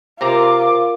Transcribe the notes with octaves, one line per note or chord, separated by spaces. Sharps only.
C3 C4 F4 A#4 A#5 D6